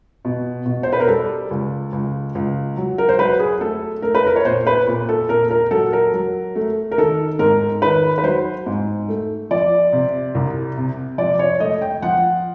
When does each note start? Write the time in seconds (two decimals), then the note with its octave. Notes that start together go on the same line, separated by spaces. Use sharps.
0.25 B2
0.66 B2
0.83 C5
0.93 B4
1.00 A#4
1.08 G3 A4
1.51 C#2
1.93 C#2
2.35 C#2
2.77 F#3
2.98 A#4
3.09 C5
3.19 F#3 B4
3.39 G#4
3.61 A3 A4
4.02 A3 A#4
4.15 B4
4.27 A#4
4.36 C#5
4.45 A#2 C5
4.67 B4
4.87 A#2
5.09 A4
5.29 A#2 A#4
5.51 A#4
5.71 F#3 A4
5.93 A#4
6.14 F#3
6.56 A3
6.91 A#4
6.98 D#3 A4
7.39 G#2 A#4
7.82 D#3 B4
8.18 B4
8.23 F#3 C5
8.66 G#2
9.09 A3
9.51 F3 D5
9.92 C3
10.35 C2
10.77 C3
11.18 F3 D5
11.39 C#5
11.60 A3 D#5
11.81 G5
12.02 F3 F#5